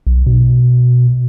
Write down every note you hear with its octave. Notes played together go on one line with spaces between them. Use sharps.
B1
B2